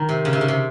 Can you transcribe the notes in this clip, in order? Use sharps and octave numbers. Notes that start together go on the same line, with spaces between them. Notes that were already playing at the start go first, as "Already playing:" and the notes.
Already playing: D#3
C3
C#3
C3
C#3
C3